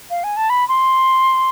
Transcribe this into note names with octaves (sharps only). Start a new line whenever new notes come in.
F5
G#5
A5
B5
C6